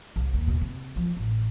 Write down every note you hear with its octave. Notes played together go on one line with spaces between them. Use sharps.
C2
D#2
B2
C3
F3
A1